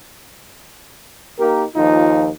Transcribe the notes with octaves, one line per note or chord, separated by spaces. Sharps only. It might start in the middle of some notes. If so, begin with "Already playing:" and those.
A#3 D#4 G4 A#4
D#2 F3 D#4 F4